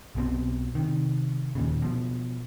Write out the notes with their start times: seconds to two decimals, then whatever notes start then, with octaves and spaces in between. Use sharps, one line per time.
0.15 B1 B2 C4
0.75 C3 D#3
1.55 D#2 A#2 C#3
1.82 B2 F3